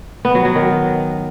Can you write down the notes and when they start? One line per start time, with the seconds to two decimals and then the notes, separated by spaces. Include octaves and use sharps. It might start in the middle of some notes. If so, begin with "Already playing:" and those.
0.25 B3
0.35 F#3
0.45 F#3
0.55 D#3